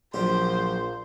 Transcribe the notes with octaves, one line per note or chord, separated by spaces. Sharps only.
A#1 F3 F#3 G4 C5